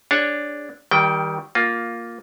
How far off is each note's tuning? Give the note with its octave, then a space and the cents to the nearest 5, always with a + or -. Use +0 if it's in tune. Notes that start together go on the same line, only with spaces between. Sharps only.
D4 +0 G#4 -20 C#5 +0
D#3 +30 G3 +0 G5 -10
A#3 +0 F4 +10